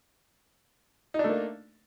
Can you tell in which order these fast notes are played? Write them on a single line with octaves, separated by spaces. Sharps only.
D#4 D4 A3 A#3